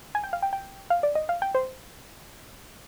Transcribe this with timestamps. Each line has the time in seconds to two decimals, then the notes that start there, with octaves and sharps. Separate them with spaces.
0.15 G#5
0.24 G5
0.33 F5
0.42 G5
0.53 G5
0.90 F5
1.03 D5
1.15 D#5
1.29 F5
1.42 G5
1.55 C5